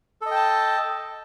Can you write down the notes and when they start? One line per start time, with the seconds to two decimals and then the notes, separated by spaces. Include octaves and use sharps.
0.21 A4
0.26 D#5
0.31 G5
0.36 A5